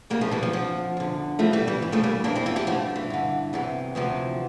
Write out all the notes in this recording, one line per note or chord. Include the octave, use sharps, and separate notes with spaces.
G2 E3 G3 A#3
F3 A3
E3 G3
F3
F2 D3 F3
E2 D3
G2 E3 F3 A3
E3 G3
E3 G3
G2 E3
F3 A3
G3 A#3
F2 E3 A#3 D4
C4 E4
F4 A4
E4 G4
G2 D3 F3 A3
E3
G2 D3
E2 C3 E3
D2 C3 E3 F3